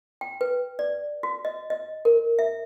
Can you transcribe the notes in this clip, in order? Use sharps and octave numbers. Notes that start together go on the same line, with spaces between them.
G5
B4
D5
F#4
D#5
D#5
A#4
E5